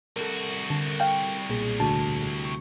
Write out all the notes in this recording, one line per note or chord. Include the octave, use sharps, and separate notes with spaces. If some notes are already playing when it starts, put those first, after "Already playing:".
C2 F#4 A4 A#4
D3
F5 G5
B1 A#2 G#4
D2 A5
C#6